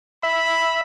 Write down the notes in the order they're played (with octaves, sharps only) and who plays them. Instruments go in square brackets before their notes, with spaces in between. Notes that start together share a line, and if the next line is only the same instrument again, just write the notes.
[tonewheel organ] E5 [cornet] B5